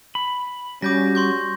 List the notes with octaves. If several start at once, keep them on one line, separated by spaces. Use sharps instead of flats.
B5
G3 C#4 F#4 D6 G6 A#6
C6 C#6 G6